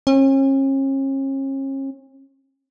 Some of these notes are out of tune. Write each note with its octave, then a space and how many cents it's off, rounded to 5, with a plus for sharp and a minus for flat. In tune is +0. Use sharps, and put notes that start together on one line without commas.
C#4 -40